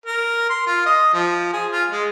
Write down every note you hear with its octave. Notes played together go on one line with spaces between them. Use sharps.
A#4
C6
F4
D#5
F3
G#4
F4
G#3